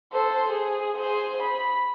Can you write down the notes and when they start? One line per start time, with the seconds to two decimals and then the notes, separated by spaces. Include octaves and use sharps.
0.12 A4 C5
0.49 G#4
0.97 G#4 C5
1.42 B5